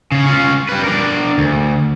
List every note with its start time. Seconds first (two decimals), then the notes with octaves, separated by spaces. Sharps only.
0.12 C#3 C#4
0.26 C#4 F4
0.69 G3 B4
0.84 D4 A#4
1.38 D2